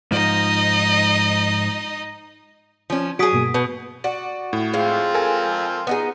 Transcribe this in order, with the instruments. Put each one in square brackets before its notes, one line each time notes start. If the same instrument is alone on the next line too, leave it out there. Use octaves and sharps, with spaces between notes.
[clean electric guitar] G#2 F3 [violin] D#4 D#5
[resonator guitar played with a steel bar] F3 C#4
[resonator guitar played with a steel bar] F#3 G#4 [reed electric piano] F#4 [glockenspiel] D#6 B6 D7
[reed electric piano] G2 B2 A#3
[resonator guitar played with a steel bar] B2 [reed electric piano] B4
[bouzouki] F#4 [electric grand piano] D5
[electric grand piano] A2
[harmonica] F3 C4 F4 [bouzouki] G#3 F5
[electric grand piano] A4 A#4 G#5
[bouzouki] B3 D#4 G#4